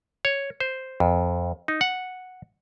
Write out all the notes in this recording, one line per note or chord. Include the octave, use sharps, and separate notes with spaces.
C#5
C5
F2
D#4
F#5